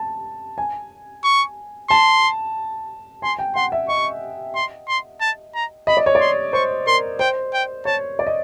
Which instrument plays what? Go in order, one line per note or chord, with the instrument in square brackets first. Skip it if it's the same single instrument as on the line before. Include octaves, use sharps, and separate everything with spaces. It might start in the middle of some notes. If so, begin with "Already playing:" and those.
Already playing: [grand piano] A5
G#5
[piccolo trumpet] C#6
[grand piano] A5 [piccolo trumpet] C6
[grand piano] G#5 [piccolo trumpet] C6
[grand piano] G5
[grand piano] F#5 [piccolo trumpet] C6
[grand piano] E5
[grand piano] D#5 [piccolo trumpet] C#6
[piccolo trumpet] C6
C6
A5
A#5
[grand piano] D#5 [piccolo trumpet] B5
[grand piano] D5
C#5
D5
[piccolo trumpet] C6
[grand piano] C5 [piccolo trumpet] C#6
[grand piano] A#4 [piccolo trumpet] C6
[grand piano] C5 [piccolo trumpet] G5
[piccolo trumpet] G5
[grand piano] C#5 [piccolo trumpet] A5
[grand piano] D5
D#5